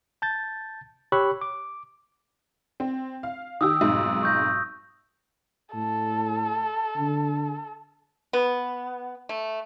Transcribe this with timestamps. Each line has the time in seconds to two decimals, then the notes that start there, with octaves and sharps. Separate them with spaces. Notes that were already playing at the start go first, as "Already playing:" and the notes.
0.22 A5 G6 A6
1.12 G4 C#5 B5 C#6 E6 F#6
1.41 D6
2.80 C4
3.23 F5
3.61 D#3 G4 D#6 E6
3.81 B1 F2 G#2
4.23 C#6 G6 A#6
5.74 A2 A4
6.97 D3
8.33 B3
9.29 A3